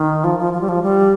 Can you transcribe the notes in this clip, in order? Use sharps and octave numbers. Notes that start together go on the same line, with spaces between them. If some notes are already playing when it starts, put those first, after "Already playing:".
Already playing: D#3
F3
F3
F3
G3
F3
G3